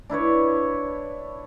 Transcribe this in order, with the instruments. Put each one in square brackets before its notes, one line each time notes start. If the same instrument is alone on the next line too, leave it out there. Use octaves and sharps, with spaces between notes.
[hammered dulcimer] D4 E4 B4 C#5